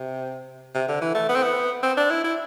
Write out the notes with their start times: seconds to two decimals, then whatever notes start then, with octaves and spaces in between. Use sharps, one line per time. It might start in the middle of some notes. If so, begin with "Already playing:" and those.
Already playing: C3
0.74 C3
0.88 D3
1.01 E3
1.15 A3
1.29 B3
1.36 C4
1.43 B3
1.83 C4
1.97 D4
2.10 E4
2.24 E4